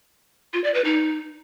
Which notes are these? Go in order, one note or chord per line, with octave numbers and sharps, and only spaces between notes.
F4
D5
B4
D#4